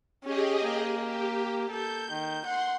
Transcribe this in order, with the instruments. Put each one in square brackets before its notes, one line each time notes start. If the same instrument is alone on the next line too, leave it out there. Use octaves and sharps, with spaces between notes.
[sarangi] C#4 [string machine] G4 G#4 D#5
[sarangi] A#3
[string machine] G4
[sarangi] A4 [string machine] G6
[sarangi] D#3
[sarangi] F#5 [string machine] C6